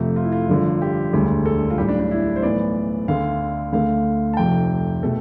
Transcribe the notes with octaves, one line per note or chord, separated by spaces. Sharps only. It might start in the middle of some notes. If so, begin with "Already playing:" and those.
Already playing: F2 C3 F3 A3
F4
E4
F4
G1 G2 D3 F3
G4
E1 D2 D3 G3
A4
F4
B1 A2 G3 G4
D4
D4
E4
C5
B1 A2 E3 B3 D5
D2 D3 A3 F5
D2 D3 A3 F5
A5
F1 F2 C3 G5
B2 A3 A4